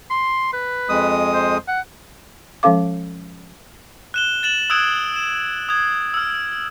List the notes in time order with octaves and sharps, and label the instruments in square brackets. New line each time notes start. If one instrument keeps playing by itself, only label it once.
[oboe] C6
B4
[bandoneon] F2 G#3 D#6
[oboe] C5
F#5
[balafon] F3 G#3 C#4 A4 F5 D6
[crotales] F#6 E7 G7
A6 E7 F#7
D#6 E6 F#6 G#6 D7
E7
D#6 G#6
E6 F6